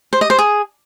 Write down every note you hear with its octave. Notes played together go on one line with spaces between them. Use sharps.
C5
D#5
C5
G#4